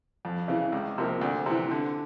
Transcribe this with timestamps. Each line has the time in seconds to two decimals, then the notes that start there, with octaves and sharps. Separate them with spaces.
0.25 F2
0.48 C#3 E3
0.72 C#2
0.98 C3 F3 A#3
1.21 D2
1.46 C3 E3
1.71 D3